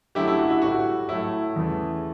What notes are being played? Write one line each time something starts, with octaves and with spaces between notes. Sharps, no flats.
F#2 D3 F#3 A3 E4 G4
E4
F#4
E4
A2 G3 F#4
A2 F#3 A3 E4
E2 C#3 E3 A3